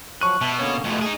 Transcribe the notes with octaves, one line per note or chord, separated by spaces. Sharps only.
F3 F#3 C#6 F#6 D#7
B2 E5 A5
D3 A#3 C#4 C#5
F2 B2 G#3 A3
D#4 G#4